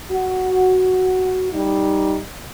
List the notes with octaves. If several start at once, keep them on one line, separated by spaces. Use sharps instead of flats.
F#4
G3 D#4